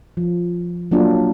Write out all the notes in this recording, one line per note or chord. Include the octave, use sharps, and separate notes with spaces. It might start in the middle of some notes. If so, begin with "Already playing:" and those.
F3
F#3 A#3 D4 F4